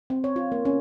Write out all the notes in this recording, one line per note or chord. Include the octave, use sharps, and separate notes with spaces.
C4
C#5
F4
A#3
C#4